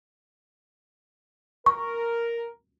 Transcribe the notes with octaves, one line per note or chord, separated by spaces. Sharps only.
A#4 C#6